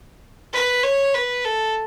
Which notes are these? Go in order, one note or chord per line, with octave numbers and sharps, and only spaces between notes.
B4
C#5
B4
A4